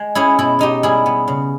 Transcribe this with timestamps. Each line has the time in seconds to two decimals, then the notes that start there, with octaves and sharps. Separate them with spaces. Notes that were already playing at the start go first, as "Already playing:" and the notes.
Already playing: G#3
0.15 C#4 E4 G#4
0.39 B2 E4
0.59 B2 D#4 G4
0.83 G3 E4 G#4
1.06 B3
1.28 C#3